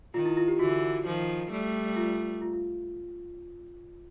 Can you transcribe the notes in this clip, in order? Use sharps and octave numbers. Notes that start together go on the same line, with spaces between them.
D#3 F4
E4
F4
G4
D3 E3 F#4
D#3 F3
G3 A3
F4
F4
F4